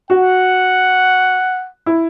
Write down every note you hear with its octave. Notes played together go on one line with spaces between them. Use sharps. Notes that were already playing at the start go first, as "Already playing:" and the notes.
F#4 F#5
E4